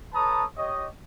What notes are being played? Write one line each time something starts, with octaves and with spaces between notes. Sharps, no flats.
A4 B4 C#5 A5 A#5 D#6
G4 C#5 D#5